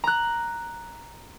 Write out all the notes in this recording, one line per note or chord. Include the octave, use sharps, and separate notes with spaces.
A#5 F#6